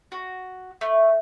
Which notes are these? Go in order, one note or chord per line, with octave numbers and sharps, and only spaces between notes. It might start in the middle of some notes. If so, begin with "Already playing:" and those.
F#4
A3